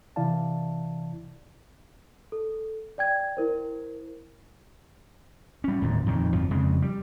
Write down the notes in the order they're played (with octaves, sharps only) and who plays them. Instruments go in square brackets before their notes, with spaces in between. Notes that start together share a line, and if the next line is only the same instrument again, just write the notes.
[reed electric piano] C3 E3 E4 D5 F5 A5
[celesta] A4
D5 G5 G#6
E4 A#4 C5
[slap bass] G3 C#4
D1 D#2 G#2
F2 A#2 D#3
G1 F2 F3
F2 C#3 G#3
G3